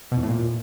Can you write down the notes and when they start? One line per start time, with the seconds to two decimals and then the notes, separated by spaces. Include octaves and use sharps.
0.12 B2
0.17 E2
0.23 A2
0.28 A#2